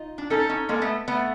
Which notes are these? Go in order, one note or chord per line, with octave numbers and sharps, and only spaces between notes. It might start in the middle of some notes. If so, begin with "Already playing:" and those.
Already playing: D#4 F4
D4
C#4 D#4 A4
C#4 D#4
G#3 A#3 A4
A3 B3
A3 B3